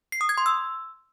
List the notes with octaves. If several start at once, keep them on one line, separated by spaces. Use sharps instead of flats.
C7
D#6
G#6
C6
E6